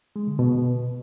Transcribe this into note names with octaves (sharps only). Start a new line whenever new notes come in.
G#3
D3
B2